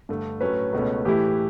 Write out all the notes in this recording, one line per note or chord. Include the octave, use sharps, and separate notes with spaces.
G2 D3 A3
A2 F#3 A3 C#4 B4
C#2 B2 A3 C#4
A2 E3 A3 E4 G4